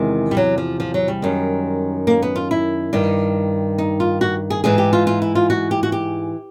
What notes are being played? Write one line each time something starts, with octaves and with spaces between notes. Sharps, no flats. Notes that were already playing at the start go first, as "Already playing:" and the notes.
Already playing: E2 C3 D#3 G#3
G3
F#3
F3
F3
F#3
G3
F#2 D#3
A#3
B3
F4
E4
G2 D#3
D#4
F4
F#4
G#4
G#2 E3 G#4
G4
F4
F4
E4
F4
F#4
G4
F#4
G4